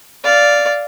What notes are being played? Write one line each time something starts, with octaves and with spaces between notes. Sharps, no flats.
D5 F5